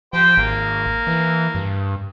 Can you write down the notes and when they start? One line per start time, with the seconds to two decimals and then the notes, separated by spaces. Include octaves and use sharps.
0.13 F3 G4 C5 G5
0.37 G#1 A#3
1.07 E3
1.55 G2